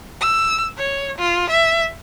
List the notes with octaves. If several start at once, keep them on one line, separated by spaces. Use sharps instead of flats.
E6
C#5
F4
E5